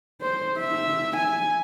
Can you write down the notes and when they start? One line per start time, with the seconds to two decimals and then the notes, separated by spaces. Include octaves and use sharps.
0.21 C5
0.59 E5
1.17 G#5